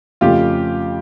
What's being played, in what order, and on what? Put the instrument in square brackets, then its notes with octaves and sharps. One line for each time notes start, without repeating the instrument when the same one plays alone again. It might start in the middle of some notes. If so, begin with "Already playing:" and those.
[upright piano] F2 C#3 F3 A3 [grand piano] F4 G4